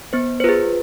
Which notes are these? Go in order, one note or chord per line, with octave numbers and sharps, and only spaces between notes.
B3 C5
C5
F4 G#4 B4